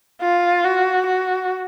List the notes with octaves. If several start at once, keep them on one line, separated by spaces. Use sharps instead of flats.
F4
F#4
F#4